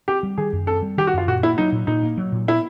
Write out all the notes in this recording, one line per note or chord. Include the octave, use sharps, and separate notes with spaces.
C4 G4
G3
D#3 G#4
F#2
C4 A4
G3
D#3 G4
F#4
F#2 F4
A#2 F#4
A#3 E4
F#3 D#4
A#2
A#2 D#4
A#3
F#3
A#2
B3 E4